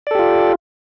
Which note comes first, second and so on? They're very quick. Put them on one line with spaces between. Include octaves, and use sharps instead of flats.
D5 A4 G4 F4